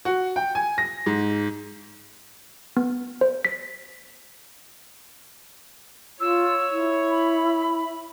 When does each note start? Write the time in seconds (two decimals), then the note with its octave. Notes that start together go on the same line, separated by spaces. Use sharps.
0.05 F#4
0.36 G5
0.55 G#5
0.78 A#6
1.06 G#2
2.77 B3
3.21 C5
3.45 B6
6.20 F4 C#5 E6
6.71 E4
7.10 B5